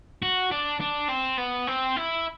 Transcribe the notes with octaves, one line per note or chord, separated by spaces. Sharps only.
F#4
D4
D4
C4
B3
C4
E4